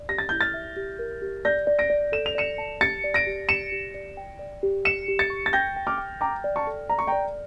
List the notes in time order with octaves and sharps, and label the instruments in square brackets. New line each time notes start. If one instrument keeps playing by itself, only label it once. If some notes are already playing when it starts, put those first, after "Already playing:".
Already playing: [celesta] D5
[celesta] G4 [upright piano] A#6
[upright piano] A6
[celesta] E4 [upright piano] G6
[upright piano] F6 A6
[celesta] E5
G4
A#4
G4
[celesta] D5 [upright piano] G6 A#6
[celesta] D5
[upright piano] A#6 D7
[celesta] D5
[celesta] A4 [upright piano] E7
[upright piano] F7
[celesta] D5 [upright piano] C#7 E7
[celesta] A5
[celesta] G4 [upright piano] A6 C#7
[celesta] D5
[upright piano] A#6 D7
[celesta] G4
[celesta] G4 [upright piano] C#7 E7
[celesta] G4
D5
G5
D5
G4
[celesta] G4 [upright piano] C#7 E7
[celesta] G4
[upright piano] A6 C#7
[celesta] C#6
[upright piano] A6
[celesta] G5 [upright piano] G6 A#6
[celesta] G5
[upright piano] D6 F6
[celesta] G5
[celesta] G5 [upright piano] A#5 D6
[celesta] D5
[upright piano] A5 C#6
[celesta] A4
[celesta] D5 [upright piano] A#5
[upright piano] C#6
[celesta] D5 [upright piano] G5 A#5